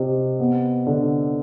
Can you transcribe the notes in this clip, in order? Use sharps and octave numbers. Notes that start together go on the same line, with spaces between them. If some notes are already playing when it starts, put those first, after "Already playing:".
Already playing: C3 C4 D#5
B3
D3